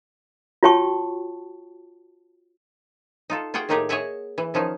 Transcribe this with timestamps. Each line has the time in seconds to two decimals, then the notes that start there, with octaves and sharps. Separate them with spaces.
0.63 F4 F#4 C#5 G5 A5 C#6
3.30 D#4 F4 A4
3.54 F4 F#4 G#4 F#5 G5
3.69 A2 D#3 A#3 D#4 G4 G#4
3.89 G#4 C#5 D#5 E5 F#5 G#5
4.38 E3
4.54 D#3 F3 C#4 D#4